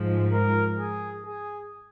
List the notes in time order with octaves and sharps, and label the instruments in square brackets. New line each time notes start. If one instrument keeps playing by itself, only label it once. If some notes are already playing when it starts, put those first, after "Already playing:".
Already playing: [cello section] G#2 F3 G#3
[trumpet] A#4
G#4
G#4